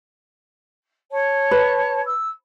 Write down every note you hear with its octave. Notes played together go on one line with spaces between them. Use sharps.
C#5 A5
B4
E6